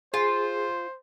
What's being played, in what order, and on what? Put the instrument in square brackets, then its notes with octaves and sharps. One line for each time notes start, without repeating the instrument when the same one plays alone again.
[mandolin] F4 [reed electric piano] G#4 [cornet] C5